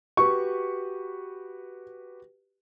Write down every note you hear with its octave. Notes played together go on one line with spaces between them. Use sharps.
F#4 G4 B4 C#6